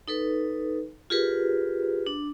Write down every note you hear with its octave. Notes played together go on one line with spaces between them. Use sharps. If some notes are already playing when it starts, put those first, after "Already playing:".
D#4 A4 B4
F4 G4 G#4 A#4 B4
D4